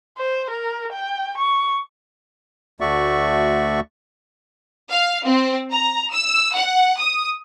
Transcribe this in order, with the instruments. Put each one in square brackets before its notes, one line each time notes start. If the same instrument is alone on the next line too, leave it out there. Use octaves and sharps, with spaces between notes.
[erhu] C5
A#4
G5
C#6
[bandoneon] D2 A3 F#4 D5 E5 C#6
[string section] F5
C4
A#5
E6
F#5
D#6